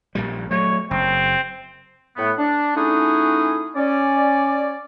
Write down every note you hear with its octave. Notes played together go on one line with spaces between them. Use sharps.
A#1 A#2 G3
F#3 A3 C#5
F#1 C4
A2 A3 B3
D4
A3 C#4 D#4 E4 F#4 G#4
C#4 D5